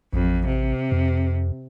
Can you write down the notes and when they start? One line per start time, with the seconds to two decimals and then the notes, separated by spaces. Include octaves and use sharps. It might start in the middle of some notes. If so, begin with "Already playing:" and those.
0.13 A1 F2
0.47 C3
0.92 F2